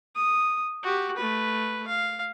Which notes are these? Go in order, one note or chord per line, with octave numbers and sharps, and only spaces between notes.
D#6
F#4 G4
A3 B4
F5